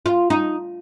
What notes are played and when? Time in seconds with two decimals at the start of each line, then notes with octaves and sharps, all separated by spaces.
0.06 F4
0.30 D#4